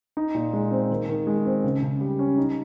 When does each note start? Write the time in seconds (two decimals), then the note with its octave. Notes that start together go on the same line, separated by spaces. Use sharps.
0.17 D#4
0.35 A#2
0.53 G#3
0.71 C4
0.90 D#3
1.09 D#3
1.27 G#3
1.45 C4
1.64 C#3
1.82 C#3
2.01 G3
2.19 C#4
2.38 D#4